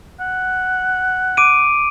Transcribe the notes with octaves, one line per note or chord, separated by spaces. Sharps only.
F#5
D6 D7 D#7